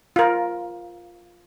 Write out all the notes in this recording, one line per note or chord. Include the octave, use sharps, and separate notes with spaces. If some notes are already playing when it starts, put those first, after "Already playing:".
F4 A#4